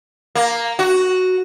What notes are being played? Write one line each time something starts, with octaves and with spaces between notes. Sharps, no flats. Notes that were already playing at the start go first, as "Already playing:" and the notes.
A#3
F#4